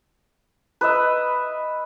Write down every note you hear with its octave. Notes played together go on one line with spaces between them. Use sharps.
B4 D#5 E5